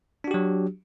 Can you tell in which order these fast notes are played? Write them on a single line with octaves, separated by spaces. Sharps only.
D4 F#4 G4 F#3